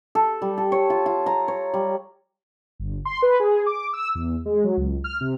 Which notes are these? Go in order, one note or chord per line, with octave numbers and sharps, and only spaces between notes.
A4
G3
A4
C#5
F4
F4
A#5
C#5
G3
G1
C6
B4
G#4
D6
E6
E2
G#3
F#3
C#2
F6
C3